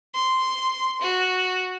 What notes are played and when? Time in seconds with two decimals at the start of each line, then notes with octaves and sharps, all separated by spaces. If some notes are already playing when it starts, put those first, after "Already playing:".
0.14 C6
1.01 F#4